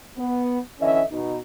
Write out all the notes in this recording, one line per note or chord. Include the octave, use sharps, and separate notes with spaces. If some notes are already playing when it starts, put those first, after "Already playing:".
B3
D3 E3 C#4 D#5 E5
B2 D#4